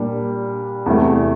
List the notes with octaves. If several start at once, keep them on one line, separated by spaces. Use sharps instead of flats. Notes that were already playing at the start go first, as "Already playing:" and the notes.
Already playing: A#2 G3 A#3 D4
E2 C3 E3 A3